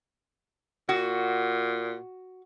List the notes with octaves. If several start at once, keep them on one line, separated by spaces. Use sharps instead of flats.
A#2 F#4